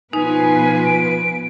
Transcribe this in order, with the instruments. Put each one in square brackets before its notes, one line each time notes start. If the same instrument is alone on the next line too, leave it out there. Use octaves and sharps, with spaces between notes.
[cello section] B2 F3 B4 [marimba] D#4 [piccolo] G#5
[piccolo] D7